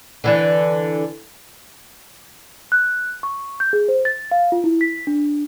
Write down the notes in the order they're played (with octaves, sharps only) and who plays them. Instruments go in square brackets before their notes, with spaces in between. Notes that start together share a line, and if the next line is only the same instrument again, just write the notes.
[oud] D3 E3 D4
[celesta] F#6
C#6
G6
G#4
C5
A6
F5
F4
E4
B6
D4